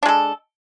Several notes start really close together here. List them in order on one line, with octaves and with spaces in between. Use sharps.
D4 G#3 A4